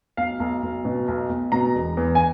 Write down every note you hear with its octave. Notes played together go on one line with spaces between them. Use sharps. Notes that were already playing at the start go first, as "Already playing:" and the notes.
B1 F5
B1
B1
B2
B1
B1
B2 A#5
E1
E2
G#5